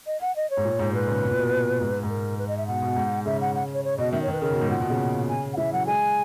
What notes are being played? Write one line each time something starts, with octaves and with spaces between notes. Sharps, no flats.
D#5
F#5
D#5
C#5
G#2
A#2
G#2
A#2 B4
C#3
B2
A#2
B2
G#2
G#2
A#4
B4
D#5
E5
B2 F#5
B2
G#2
C#3 E5
F#5
F#5
C#5
C#5
B2 D#5
D#3 E5
C#5
D#3 B4
C#3 A#4
B2
G#2
A#2 F#5
B2
C#3
G#5
F#5
E3 E5
F#3 F#5
G#3 G#5